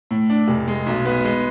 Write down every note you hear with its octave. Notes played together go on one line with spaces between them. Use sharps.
A2
D4
F1
G#3
B1
B3
G#3